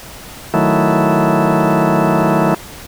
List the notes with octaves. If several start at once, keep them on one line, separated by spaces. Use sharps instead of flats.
D#3 F#3 A3 E4